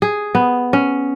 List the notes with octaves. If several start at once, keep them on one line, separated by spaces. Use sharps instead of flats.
G#4
B3
C#4